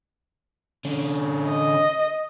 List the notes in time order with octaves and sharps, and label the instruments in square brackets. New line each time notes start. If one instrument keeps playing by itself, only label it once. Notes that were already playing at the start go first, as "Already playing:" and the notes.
[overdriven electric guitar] D3 C#4
[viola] D#5